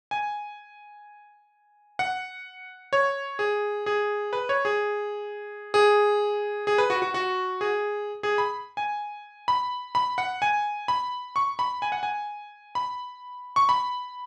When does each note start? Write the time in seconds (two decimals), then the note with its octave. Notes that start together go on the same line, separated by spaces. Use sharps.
0.11 G#5
1.99 F#5
2.93 C#5
3.39 G#4
3.86 G#4
4.33 B4
4.49 C#5
4.65 G#4
5.74 G#4
6.67 G#4
6.78 B4
6.90 F#4
7.02 F#4
7.14 F#4
7.61 G#4
8.23 G#4
8.38 B5
8.77 G#5
9.48 B5
9.95 B5
10.18 F#5
10.42 G#5
10.88 B5
11.36 C#6
11.59 B5
11.82 G#5
11.92 F#5
12.03 G#5
12.75 B5
13.56 C#6
13.69 B5